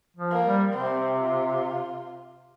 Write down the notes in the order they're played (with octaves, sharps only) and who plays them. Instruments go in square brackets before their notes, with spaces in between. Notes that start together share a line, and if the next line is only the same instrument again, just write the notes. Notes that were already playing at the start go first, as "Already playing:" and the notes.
[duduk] F3
[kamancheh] A#3
[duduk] G3
[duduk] C3 [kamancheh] C4
[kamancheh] F4